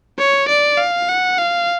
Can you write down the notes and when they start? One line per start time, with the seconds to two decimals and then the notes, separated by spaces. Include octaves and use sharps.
0.18 C#5
0.48 D5
0.78 F5
1.09 F#5
1.38 F5